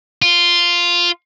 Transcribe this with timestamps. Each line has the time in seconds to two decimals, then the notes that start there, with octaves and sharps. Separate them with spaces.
0.22 F4